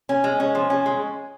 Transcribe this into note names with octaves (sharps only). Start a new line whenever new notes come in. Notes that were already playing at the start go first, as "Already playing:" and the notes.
C#4
G#3
C#4
F3
C#4
G#3